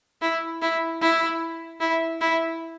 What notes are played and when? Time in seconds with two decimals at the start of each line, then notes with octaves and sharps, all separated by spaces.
0.22 E4
0.62 E4
1.02 E4
1.80 E4
2.21 E4